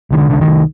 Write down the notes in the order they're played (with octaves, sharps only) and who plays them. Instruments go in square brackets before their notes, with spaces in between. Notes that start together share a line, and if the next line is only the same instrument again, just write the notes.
[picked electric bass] C2 D#3
D3
C2 D3
D#3
C2